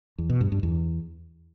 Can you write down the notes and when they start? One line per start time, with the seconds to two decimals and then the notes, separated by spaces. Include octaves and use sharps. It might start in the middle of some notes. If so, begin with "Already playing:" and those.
0.18 E2
0.30 B2
0.41 G2
0.52 G2
0.63 E2